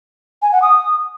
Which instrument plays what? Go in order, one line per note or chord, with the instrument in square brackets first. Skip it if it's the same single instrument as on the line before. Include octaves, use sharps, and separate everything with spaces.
[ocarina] G#5
F#5
D#6